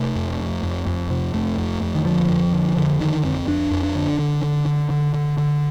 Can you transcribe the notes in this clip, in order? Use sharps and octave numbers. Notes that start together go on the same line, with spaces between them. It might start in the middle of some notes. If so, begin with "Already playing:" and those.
Already playing: C3 A3
F2
F2
F2
F2
C3
F2 A3
F2
F2
D#3
D3 F3
F2
D3
F2 D3
D3 D#3
F2 C4
F2 D4
F2
D4
D3
D3
D3
D3
D3
D3
D3